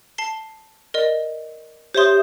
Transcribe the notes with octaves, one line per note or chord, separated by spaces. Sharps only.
A5 C7 G7
A#4 D5 D#5
G4 C5 C#5 E5 C6 D#6